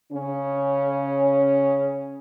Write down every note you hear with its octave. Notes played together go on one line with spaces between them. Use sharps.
C#3 C#4